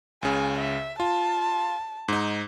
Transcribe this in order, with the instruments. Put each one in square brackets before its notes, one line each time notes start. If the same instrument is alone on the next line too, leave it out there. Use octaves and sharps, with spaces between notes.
[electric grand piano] C#2 C#3 [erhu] G#5
[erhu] E5
[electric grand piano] F4 [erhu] A5
[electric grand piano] G#2 D#4